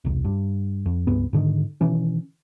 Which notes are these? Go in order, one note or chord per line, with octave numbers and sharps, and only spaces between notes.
E1 C2
G2
F2
C#2 G2 B3
G#2 D3 D#3
B2 D#3 E3 C#4